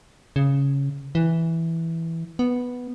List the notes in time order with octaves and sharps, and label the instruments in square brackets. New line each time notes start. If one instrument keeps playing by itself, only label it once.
[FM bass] C#3
E3
B3